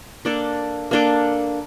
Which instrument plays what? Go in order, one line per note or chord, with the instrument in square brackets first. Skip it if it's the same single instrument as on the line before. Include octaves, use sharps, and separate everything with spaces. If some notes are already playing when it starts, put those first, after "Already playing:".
[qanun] A#3 D4 A4 D5
A#3 D4 A4 D5